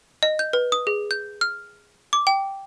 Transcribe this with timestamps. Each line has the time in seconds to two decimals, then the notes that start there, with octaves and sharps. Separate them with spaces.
0.23 D#5
0.39 G6
0.53 B4
0.72 D#6
0.87 G#4
1.11 G6
1.41 F6
2.13 D6
2.27 G5